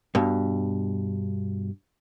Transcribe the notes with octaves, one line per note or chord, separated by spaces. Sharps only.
G2 B2